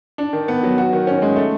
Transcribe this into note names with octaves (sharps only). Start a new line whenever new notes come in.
D4
D#3
B3
F#3
F#4
D#3
C#4
G#3
A3